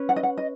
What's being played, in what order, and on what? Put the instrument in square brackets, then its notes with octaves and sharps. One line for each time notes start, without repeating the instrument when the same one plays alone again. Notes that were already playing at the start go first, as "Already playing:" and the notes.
Already playing: [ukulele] C#4 B4
F#5
D#5
F#5
D#5